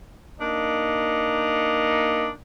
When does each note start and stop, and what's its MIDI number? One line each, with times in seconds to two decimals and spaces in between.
0.41 2.30 58
0.41 2.30 62
0.41 2.30 63